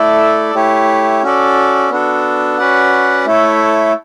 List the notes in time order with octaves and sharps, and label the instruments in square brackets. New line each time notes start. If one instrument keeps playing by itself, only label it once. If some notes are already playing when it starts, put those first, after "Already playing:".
Already playing: [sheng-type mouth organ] A3 E4 A4 D5
A3 E4 G4 C#5
C#4 F#4 A4 D5
B3 D4 F#4 A4
C#4 F#4 B4 D5 F#5
A3 E4 A4 C#5